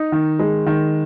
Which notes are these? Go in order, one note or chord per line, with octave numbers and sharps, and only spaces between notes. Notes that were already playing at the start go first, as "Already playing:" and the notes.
Already playing: D#4
D#3
G#3
D#3